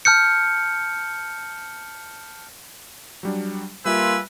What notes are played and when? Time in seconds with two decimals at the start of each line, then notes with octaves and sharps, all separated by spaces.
0.05 A5 F6 G6 C#7
3.23 F#3 G3 D4
3.85 G3 A#3 F4 B4 E5 G#5 E6